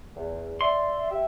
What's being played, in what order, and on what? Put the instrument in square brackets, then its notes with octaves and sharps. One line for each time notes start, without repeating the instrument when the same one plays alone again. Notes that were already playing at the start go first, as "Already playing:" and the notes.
[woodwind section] E2
[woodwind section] D5 E5 [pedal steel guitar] C6
[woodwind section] G4 E5